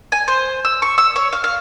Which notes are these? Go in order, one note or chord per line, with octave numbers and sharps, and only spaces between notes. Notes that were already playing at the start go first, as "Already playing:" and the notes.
G#5
C5
E6
C#6
E6
C#5
F5
F5